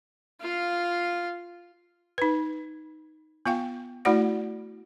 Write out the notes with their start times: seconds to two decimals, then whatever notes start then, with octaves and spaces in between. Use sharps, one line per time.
0.41 F4 F5
2.18 D#4 B4
3.46 B3 F4 F5 G5
4.05 A3 E4 F#4 D5 F#5